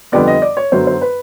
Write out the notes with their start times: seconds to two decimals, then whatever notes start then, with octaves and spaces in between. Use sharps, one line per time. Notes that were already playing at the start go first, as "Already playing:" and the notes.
0.12 F2 D3 G3 B3 D5
0.27 D#5
0.42 D5
0.57 C#5
0.72 F#2 D3 F#3 B3 C5
0.87 C5
1.01 B4